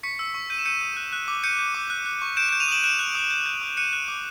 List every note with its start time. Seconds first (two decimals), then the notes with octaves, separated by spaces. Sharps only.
0.03 C#6 B6 C#7
0.19 E6
0.34 C#6
0.50 G6 D#7
0.58 E7
0.65 G6 C#7 D#7
0.81 D#6
0.97 F#6
1.13 F#6
1.28 D6
1.44 G6 C#7 D#7
1.59 G6
1.75 D6
1.90 F#6
2.06 F#6
2.22 C#6
2.37 G6 D7 E7
2.49 G6 D7 E7
2.60 D#7 F7
2.68 D#6 E7 F#7
2.84 F#6 D7 E7
2.99 F#6
3.15 D#6
3.31 G6
3.46 G6
3.62 D#6
3.77 F#6 C#7 D#7
3.93 F#6
4.08 D6